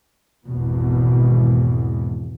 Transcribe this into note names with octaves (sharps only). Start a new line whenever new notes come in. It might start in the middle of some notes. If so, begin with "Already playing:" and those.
G#1 E2 B2